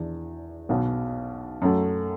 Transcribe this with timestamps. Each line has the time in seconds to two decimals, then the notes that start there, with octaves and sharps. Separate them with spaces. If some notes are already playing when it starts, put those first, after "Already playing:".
Already playing: E2 E3 D4
0.69 B1 B2 B3
1.62 F#2 F#3 A3